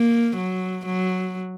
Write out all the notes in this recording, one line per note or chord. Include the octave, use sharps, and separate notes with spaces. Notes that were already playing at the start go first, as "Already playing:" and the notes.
Already playing: A#3
F#3
F#3